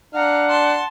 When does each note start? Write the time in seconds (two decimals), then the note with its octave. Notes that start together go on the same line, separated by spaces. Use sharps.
0.14 D4 F5 F#5 A#5
0.49 A5 C6